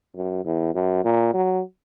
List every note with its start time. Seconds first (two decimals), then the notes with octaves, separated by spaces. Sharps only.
0.16 F#2
0.45 E2
0.74 F#2
1.04 A#2
1.34 F#3